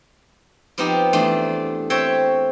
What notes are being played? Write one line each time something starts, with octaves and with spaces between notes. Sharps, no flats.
F3 B3 C4 D#4 G4
E2 A3 D4 C6
C4 C#5 E5 G5